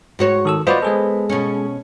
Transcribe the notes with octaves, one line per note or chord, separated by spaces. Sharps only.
G#2 F#4 C#5
D#3 A4 E6
B3 F4 F#4 C5 D5 D#5
G#3 G#4 A4
B2 C#4